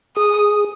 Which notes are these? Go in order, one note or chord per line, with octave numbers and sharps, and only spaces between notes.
G#4 D#6